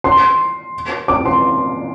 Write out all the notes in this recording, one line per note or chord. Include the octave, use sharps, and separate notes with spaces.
C6
D6
C6